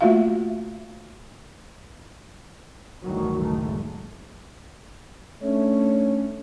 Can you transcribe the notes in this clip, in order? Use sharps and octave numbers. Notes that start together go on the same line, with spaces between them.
A3 A#3 F4 F#4 E5 F5
G1 D2 A2 D#3 E3 F#3
F#1 G#3 A3
A3 C#4 D4 C#5